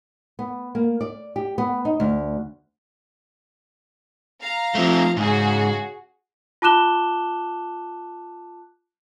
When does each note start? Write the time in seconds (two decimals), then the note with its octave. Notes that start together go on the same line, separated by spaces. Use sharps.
0.39 B3
0.75 A#3
1.01 D5
1.36 G4
1.58 B3
1.85 D#4
2.00 D2
4.41 F5 A#5
4.75 F3 A3 C4
5.17 G#2 C#3 F#4 G#4
6.62 F4 A5 D6 F#6 E7 G7